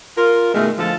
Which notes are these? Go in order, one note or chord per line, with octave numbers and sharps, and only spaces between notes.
F4 A#4
B2 D#3 G#3 A3
A2 D3 F3 G#3 F4 A4